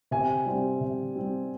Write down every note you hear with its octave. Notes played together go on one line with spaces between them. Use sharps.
C3 G#5
G3 C4
C3
G3 C4